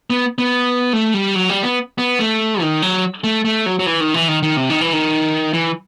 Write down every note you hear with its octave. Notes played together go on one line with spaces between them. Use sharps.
B3
B3
A3
G3
F#3
G3
B3
B3
A3
D#3
F#3
A3
A3
F#3
F#3
E3
D#3
E3
D#3
D#3
C3
D#3
E3
D#3
E3